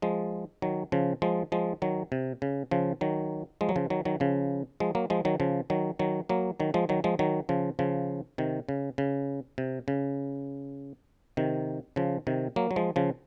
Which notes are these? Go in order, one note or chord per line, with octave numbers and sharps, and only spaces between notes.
F3 G#3
D#3 F#3
C#3 F3
F3 G#3
F3 G#3
D#3 F#3
C3
C#3
C#3 F3
D#3 F#3
F3 G#3
F#3
C#3 F3
D#3 F#3
D#3 F#3
C#3 F3
F3 G#3
F#3 A#3
F3 G#3
D#3 F#3
C#3 F3
D#3 F#3
D#3 F#3
F#3 A#3
D#3 F#3
F3 G#3
D#3 F#3
F3 G#3
D#3 F#3
C#3 F3
C#3 F3
C3 D#3
C#3
C#3
C3
C#3
C3 D#3
C#3 F3
C3 D#3
F#3 A#3
F#3
F3 G#3
C#3 F3